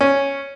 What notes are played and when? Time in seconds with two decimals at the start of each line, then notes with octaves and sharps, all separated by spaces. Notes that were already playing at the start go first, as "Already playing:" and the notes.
0.01 C#4